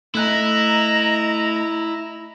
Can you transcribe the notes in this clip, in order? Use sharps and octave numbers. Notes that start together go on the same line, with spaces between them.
A3 E4 D#5 A#5 F#6